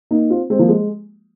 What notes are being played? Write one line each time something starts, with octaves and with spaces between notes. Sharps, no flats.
A#3 D#4
C4 F4
G#3 C4
F3 A#3
G#3